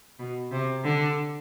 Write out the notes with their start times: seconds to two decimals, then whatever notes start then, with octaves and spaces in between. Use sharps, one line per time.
0.20 B2
0.52 C3
0.84 D3